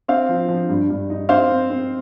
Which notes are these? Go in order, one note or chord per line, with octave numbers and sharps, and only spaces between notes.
C4 C5 F5
F3
F3
G2
G2
D#4
C4 C5 F5
C4
C4